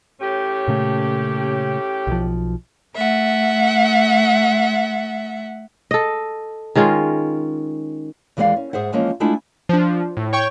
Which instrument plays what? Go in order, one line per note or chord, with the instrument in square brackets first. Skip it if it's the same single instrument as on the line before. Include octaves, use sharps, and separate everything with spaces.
[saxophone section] A2 C#4 G4
[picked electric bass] A#2 C#3 A3
B1 F3
[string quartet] A3 E5 F#5
[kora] A4 D#5
D#3 G#3 C#4 F4
[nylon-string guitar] D#2 E3 G#3 A4 D5 F5
C#4
G#2 G#4 C5 E5 F#5
E3 F3 G#3 A#3 C#4
G#3 A3 D4 E4 F4 G#5
[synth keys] F3 D4
A2
C#5 G5 C#6